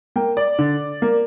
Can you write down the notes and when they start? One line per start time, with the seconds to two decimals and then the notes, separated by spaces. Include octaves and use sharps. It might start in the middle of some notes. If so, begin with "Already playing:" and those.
0.16 A#3 G5
0.37 D5
0.59 D3
1.02 A#3